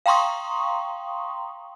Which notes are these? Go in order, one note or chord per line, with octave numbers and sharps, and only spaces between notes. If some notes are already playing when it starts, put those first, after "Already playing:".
F5 G5 A#5 C6 C#6 D#6